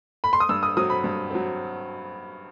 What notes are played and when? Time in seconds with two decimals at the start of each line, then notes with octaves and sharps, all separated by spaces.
0.24 B5
0.33 C6
0.40 D#6
0.49 G2 E6
0.63 D#6
0.77 F#3 C4 D#6
0.90 B5
1.04 G2
1.30 F#3 C4